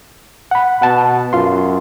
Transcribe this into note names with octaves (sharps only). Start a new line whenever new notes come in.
F#5 B5
B2 F#5 A5
F#2 F4 C6